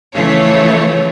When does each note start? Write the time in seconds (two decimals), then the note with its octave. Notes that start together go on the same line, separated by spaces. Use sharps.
0.14 C#3 E3 F3 A3 C#5